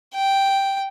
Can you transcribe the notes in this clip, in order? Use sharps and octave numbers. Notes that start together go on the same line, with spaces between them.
G5